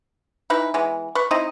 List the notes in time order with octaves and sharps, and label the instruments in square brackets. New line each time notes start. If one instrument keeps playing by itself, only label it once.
[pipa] E3 D#4 E4 B4
E3 G#3 B3
B4 C#6
C4 D#4 E4 D#5